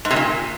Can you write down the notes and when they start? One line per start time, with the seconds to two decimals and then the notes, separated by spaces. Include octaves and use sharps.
0.05 G#2
0.11 C3
0.16 A#2